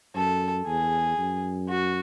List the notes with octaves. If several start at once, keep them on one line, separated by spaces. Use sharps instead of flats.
F#2 A4
E2 G#4
F#2
F#4